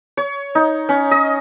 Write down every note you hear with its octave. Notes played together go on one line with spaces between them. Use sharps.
C#5
D#4
C#4
D#5